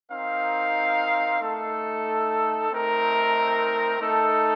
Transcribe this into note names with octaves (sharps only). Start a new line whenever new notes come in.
C4 D#4 A#4 F5
A3 D#4 A4
A3 C4 D#4 A#4
A3 D#4 A4